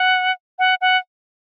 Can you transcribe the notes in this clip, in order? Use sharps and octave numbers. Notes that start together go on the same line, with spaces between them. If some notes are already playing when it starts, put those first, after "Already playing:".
Already playing: F#5
F#5
F#5